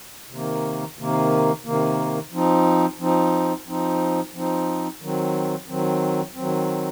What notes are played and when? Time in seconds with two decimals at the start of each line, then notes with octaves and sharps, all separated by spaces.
0.30 C3 D#3 A#3
0.97 C3 D#3 A#3
1.65 C3 D#3 A#3
2.32 F3 C4 D#4
2.99 F3 C4 D#4
3.67 F3 C4 D#4
4.34 F3 C4 D#4
5.01 D#3 F#3 C4
5.68 D#3 F#3 C4
6.35 D#3 F#3 C4